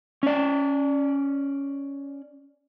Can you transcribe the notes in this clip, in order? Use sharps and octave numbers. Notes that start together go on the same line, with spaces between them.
C#4 D5